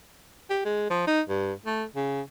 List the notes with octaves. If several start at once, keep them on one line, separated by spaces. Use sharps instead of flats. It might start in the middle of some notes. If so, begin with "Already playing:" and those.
G4
G#3
F3
D#4
G2
A3
C#3